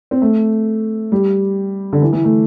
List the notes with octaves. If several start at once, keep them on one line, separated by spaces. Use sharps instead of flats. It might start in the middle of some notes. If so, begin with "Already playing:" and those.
C4
A3
G3
D3
E3
E3
A3